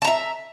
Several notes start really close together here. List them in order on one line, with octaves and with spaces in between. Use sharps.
A5 A#5 E5